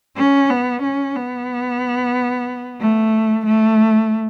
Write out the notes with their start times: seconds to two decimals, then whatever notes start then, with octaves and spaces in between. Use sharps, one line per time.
0.17 C#4
0.50 B3
0.83 C#4
1.16 B3
2.81 A3
3.46 A3